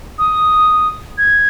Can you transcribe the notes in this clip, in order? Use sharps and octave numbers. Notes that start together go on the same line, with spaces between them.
D#6
G#6